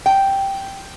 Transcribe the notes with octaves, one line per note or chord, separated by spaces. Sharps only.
G5